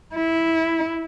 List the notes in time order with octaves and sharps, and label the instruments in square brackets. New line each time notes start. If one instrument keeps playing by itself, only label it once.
[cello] E4